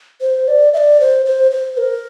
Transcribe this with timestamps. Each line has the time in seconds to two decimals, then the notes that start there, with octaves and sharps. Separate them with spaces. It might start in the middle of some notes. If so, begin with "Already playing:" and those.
0.21 C5
0.48 D5
0.74 E5
0.77 D5
1.00 C5
1.26 C5
1.51 C5
1.78 A#4